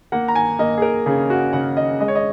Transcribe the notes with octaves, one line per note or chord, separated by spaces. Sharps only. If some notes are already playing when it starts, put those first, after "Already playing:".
A#3 F#5
A#5
G#5
A#3 D#5
G#4
A#4
C#3 G#4
F#4
C#3 F#5
D#5
G#3 D#5
C#5
D#5